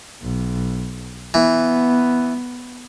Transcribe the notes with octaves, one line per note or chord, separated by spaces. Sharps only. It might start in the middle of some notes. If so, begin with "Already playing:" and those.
B1
E3 B3